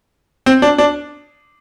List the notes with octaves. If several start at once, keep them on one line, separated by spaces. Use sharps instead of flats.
C4
D4
D4